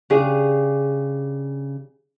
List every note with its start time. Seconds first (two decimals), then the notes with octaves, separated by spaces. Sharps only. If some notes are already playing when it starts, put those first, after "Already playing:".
0.10 C#3 D4 G4 G#4